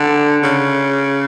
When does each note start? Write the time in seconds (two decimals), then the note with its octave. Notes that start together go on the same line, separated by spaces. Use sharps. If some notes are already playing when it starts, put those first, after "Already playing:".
Already playing: D3
0.43 C#3